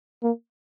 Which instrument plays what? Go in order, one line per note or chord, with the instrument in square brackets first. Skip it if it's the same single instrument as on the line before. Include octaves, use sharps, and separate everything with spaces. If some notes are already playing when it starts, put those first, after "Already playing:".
[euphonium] A#3